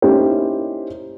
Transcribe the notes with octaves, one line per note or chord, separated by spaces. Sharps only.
A#3 C#4 D#4 E4 G4 C5